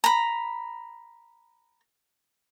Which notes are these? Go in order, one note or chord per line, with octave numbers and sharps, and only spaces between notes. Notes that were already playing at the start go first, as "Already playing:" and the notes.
A#5 B5